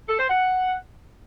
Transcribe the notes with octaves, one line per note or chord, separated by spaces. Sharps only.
A4
C5
F#5